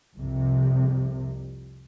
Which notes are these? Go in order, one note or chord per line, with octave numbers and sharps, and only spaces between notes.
C2 F2 C3